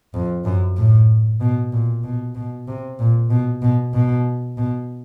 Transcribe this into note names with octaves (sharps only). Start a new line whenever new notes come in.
F2
F#2
A2
B2
A#2
B2
B2
C3
A#2
B2
B2
B2
B2